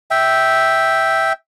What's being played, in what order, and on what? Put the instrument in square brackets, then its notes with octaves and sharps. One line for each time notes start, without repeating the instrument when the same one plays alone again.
[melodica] E5 G5